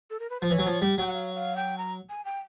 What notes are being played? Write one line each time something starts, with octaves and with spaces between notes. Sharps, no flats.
A4
A#4
B4
F3 C5
E3 C#5
F#3
F3
G3 G5
F#3 G5
F#5
F5
F5
G5
A#5
G#5
G5